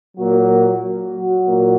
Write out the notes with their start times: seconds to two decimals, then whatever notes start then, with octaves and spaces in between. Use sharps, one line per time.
0.17 A#2 F#3 A#3 F#4
1.14 F#3 F#4
1.46 A#2 A#3